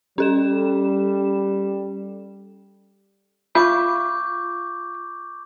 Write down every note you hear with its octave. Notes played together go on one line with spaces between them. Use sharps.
G3 C#4 A4 E7
F4 E5 B5 C#6 D6 G6